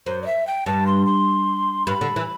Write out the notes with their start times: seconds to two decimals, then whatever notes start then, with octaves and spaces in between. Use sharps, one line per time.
0.06 F#2 C5
0.22 D5
0.26 E5
0.47 G5
0.66 G2 A5
0.87 C6
1.06 C6
1.86 G2 B5
2.01 D3
2.16 E3